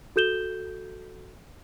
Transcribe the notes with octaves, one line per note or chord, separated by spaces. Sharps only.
F#4 A4 G6 E7 G7